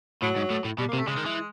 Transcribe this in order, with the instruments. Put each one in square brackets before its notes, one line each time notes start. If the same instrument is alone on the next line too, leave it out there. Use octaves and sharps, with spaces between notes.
[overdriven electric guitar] A2 [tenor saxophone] F#3
[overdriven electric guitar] G#2
A2
A2
[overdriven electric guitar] B2 [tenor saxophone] G3
[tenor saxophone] A#3
[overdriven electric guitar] C3
[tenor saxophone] A3
[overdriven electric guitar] C#3 [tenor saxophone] G#3
[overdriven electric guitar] D#3
E3